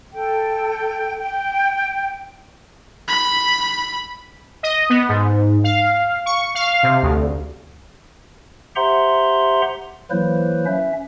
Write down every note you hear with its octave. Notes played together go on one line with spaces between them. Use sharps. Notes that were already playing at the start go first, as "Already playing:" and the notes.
A4 G5
G5
B5
D#5
B3
G#2
F5
C#6
F5
C3
D2
G4 C5 E5 F#5 A#5 C6
E3 F#3 A#3 E4 B4 C5
C#4 E5